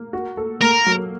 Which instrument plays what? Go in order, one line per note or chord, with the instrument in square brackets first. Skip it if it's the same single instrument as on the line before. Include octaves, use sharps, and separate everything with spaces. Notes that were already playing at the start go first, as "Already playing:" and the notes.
Already playing: [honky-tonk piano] A#3
F#4
A4
[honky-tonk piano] A#3 [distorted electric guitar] A#4
[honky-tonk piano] F#3